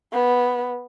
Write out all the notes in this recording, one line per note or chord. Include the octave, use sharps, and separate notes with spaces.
B3